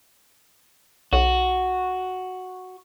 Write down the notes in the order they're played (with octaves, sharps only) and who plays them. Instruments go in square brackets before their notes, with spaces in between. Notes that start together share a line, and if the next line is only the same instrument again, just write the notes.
[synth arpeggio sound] B1 [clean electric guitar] F#4